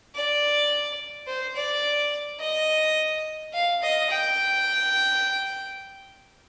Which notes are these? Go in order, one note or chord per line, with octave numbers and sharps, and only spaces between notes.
D5
C5
D5
D#5
F5
D#5
G5